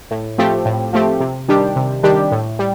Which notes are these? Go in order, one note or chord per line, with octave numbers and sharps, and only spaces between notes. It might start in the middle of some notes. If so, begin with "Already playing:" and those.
A2
F3 A3 C4 G4
A2
F3 A3 C4 G4
C3
D#3 G3 D4 G4
C3
D#3 G3 D4 G4
A2
G3